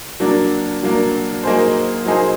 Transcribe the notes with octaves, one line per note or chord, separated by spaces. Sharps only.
F#3 A#3 D4
F#3 A#3 D4
F#3 A#3 D#4 G#4 C5
F#3 A#3 D#4 G#4 C5